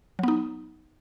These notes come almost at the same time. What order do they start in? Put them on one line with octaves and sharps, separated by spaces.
F#3 B3 D#4